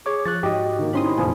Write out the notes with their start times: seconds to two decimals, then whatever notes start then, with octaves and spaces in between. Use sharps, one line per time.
0.06 G#4 C#5 D6
0.25 F3 C#6 F#6 A6
0.43 G#2 F#4 G4 D#5
0.79 D#3 A#3
0.93 C4 C#4 D#4 E4 B5 C6 D#6
1.17 F1 A#2 F3 G#5